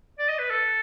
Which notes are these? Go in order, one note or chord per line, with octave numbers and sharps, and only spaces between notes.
D5
D#5
B4
A4